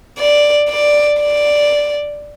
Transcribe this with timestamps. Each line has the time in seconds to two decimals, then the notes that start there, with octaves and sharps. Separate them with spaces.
0.18 D5
0.69 D5
1.21 D5